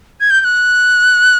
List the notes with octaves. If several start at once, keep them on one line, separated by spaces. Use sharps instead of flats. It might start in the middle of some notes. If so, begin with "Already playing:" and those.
G#6
G6
G6
F#6